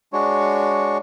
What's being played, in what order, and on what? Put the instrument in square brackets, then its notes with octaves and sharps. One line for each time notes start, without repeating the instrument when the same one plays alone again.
[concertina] G#3 D4 F#4 C#5